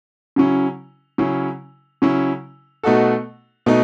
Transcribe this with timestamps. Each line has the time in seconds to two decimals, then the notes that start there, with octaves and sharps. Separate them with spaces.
0.36 C#3 F#3 C#4 E4
1.18 C#3 F#3 C#4 E4
2.02 C#3 F#3 C#4 E4
2.83 B2 A3 D#4 F#4 A4
3.66 B2 A3 D#4